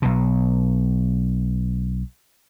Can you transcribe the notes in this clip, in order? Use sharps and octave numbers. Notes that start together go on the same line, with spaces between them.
B1 B2